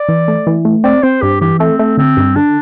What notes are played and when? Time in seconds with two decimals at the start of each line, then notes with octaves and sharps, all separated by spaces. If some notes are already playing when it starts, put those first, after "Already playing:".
Already playing: D5
0.09 E3
0.28 A3
0.47 E3
0.65 A3
0.84 C4 D5
1.03 C4 C5
1.22 G2 G4
1.41 E3 G4
1.59 A3 C4
1.79 A3
1.97 D3 C4
2.17 G2
2.36 D3 D4